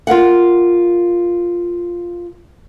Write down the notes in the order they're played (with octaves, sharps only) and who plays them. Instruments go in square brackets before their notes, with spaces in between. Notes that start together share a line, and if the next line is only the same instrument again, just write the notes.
[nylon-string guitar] F4 A#4 F5 F#5